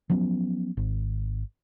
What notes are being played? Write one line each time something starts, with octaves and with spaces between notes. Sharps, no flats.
F3 F#3 B3 C#4
G#1